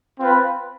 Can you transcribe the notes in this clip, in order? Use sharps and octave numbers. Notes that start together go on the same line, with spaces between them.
C4 F4 B4